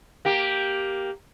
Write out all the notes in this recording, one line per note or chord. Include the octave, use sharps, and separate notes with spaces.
A#3 G4